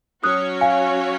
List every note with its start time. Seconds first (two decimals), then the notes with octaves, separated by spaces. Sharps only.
0.24 F#3 C#4 F#4 C#5 D#6 F#6
0.61 F5 G#5